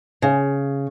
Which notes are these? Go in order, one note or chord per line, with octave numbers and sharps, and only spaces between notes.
C#3